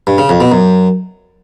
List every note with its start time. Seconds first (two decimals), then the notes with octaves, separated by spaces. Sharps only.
0.07 G2
0.18 C#3
0.29 F2
0.41 B2
0.52 F#2